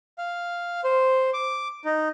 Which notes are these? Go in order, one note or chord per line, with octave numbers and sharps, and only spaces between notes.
F5
C5
D6
D#4